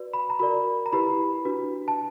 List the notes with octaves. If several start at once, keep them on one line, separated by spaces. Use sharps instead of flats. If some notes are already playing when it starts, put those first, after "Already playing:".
Already playing: F#4 B4 D5
B5
A#5
F#4 A#4 D5 B5
A#5
E4 G4 B4 B5
D4 F#4 B4
A5